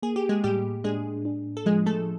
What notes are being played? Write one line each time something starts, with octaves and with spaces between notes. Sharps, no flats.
A#3 G#4
G4
G#3 G#4
A2 G3 G4
G#3 D4 G#4
D4
A4
F3 G#3 G#4
A3 A4